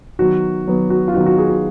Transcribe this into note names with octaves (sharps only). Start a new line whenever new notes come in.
D#3 F#3 B3 F#4
D#3 F#3 B3
F#4
F4
D#3 F#3 B3 F#4
F#4
G#4
F#4